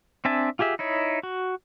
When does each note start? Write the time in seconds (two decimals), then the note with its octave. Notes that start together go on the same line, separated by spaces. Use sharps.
0.25 C4 D4 E5 G#5 A5
0.59 F4 G4 G#4 E5
0.79 D#4 E4 C#5
1.23 F#4